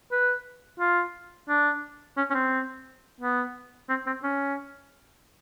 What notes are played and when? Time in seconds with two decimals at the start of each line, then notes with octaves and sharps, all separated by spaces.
0.12 B4
0.80 F4
1.49 D4
2.17 C#4
2.31 C#4
2.35 C4
3.21 B3
3.90 C4
4.06 C4
4.24 C#4